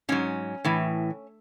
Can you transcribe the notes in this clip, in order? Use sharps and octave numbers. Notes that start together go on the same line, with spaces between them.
G#2 F#3 C#4
A2 E3